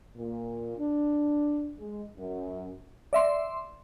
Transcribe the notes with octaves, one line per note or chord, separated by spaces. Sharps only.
A#2
D4
G#3
F#2
D5 E5 C6